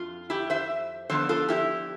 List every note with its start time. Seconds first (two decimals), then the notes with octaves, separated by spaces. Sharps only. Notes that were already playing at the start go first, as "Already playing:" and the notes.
Already playing: F2 F4
0.30 E4 G4
0.50 C5 E5
1.10 D3 F3 B3 D4 A4 C5
1.29 F4 A4
1.49 E4 G4